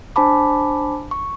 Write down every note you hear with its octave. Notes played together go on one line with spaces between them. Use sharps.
D4 C5 G#5 A5 B5 D6
C#6